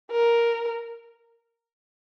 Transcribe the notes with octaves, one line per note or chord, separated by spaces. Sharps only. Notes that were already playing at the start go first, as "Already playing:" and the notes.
A#4